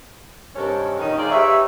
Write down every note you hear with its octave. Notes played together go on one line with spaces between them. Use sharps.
G2 C3 D#3 C#4 A4 A#4
A#2 D#3 C#4 D#4
G#3 D#4 F4 G#4 C5 D5
D#4 G4 B4 C#5 E5